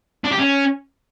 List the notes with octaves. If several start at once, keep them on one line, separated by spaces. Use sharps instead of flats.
D4
G4
C#4